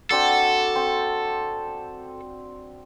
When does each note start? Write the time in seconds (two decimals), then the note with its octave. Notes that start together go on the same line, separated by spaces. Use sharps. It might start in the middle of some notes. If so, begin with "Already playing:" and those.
0.11 C4 D4 F#4 A4
0.76 C4